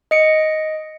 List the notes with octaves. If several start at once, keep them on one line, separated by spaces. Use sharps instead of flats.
D#5 C#7 D7